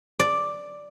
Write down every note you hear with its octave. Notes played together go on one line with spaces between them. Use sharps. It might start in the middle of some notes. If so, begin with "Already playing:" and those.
D5